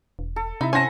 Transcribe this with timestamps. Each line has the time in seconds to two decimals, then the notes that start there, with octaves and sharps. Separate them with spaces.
0.19 E1
0.36 A4
0.61 C3 D#4 E4 E5
0.73 C#4 C5 F#5 G#5 A5 A#6